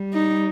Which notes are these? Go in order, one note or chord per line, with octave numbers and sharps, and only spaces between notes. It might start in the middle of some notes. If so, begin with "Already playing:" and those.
Already playing: G3
D#4